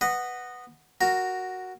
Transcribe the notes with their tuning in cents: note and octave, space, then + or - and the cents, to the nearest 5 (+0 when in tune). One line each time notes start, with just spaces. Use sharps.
B4 +0 D#5 -15 F#5 +0
F#4 +0 A#4 +0